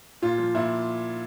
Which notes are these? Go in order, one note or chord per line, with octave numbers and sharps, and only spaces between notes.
A#2 F4
F3
A#2 E4